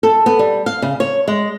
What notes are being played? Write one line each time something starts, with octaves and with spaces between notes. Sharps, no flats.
A4
B3
G3
F5
C#3
C#5
G#3